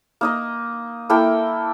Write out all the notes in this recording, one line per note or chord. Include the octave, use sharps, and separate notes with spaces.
A#3 D#4 D#5
A#3 E4 A4 G5